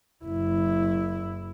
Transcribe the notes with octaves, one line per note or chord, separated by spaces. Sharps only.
F#1 E4